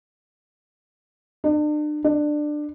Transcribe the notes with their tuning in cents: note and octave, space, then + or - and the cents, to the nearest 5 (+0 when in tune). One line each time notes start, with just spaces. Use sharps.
D4 +40
D4 +20